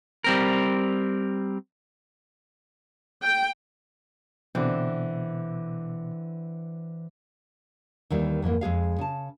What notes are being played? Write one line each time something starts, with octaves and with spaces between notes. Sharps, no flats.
G3 C4 A#4
G5
B2 D3 E3 C4
D#2 D#3 E3 G3
F2 G#2 E3 A#3
F2 G#3 G#4 F5
C#3 A5